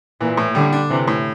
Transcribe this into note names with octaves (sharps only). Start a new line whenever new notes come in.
A#2 E3
A2
D3 G3
D4
C3 E3
A2